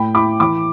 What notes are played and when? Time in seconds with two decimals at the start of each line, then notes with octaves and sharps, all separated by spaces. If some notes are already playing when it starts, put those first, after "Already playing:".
Already playing: A2 G5 B5
0.15 E4 B5 D6
0.40 E3 B5 D6